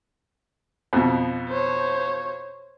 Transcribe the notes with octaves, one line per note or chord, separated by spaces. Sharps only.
F2 B2
C5 C#5